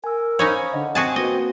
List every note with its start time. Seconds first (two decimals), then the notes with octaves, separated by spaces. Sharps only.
0.04 A#4 G#5 E6
0.39 C#4 D#4 C5 C#5 F5 B5
0.73 D3 D#5 F#5
0.95 C4 F#4 G#4 A5
1.16 A#3 F#4 B4 D#5